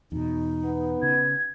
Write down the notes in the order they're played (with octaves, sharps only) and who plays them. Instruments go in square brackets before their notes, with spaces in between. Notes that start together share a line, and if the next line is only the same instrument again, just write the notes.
[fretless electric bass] E2 B2 [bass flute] D#4
[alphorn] B3
[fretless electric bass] C#3 [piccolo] G#6